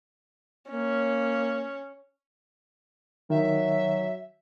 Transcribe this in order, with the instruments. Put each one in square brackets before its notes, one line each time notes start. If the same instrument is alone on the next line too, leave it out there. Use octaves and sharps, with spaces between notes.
[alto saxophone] A#3 [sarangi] C#4
[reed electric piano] D#3 [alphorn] F#3 [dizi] E5